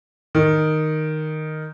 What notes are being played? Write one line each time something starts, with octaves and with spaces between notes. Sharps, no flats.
D#3